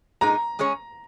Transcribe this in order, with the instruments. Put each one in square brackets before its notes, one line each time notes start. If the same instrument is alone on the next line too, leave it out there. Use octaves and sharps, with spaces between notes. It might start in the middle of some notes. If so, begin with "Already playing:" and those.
[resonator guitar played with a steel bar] A#2 G#3 D#4 [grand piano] A#5
[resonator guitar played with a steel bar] G#3 C#4 G#4 C#5